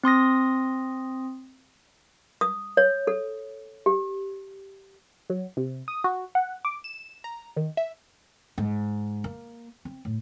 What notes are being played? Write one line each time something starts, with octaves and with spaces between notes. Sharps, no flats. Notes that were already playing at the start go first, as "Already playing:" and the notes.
C4 C6 D#6 A#6
D#6
C#5
A4
G4
F#3
C3
D#6
F#4
F#5
D6
E7
A#5
D#3
E5
G#2
A#3
C4
A2